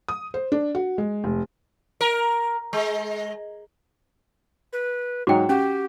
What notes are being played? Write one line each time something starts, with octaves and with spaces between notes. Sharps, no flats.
D#6
C5
D4
F#4
G#3
F1
A#4
G#3
B4
G#2 F#3 D#4 F#4 G5
C#4 F#4 G4